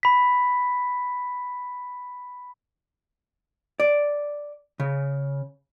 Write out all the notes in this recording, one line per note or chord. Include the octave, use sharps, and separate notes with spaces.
B5 B6
D5
C#3